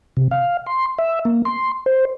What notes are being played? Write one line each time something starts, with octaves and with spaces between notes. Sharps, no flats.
C3
F5
C6
E5
A#3
C6
C5